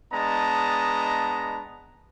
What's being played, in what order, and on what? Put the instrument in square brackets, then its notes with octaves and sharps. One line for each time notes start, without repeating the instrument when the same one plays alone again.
[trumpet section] G#3 B3 D4 D#5 A5 A#5